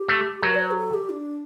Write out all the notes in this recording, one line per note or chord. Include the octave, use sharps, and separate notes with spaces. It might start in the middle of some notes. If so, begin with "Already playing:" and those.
Already playing: G4
A3
F#3 A#4
D5
C5
G4
A4
G4
D4